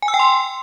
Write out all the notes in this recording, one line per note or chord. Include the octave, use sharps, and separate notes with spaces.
G#5
E6
G5
C6